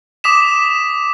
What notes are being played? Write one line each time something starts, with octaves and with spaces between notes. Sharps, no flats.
D6 D#6 B6 E7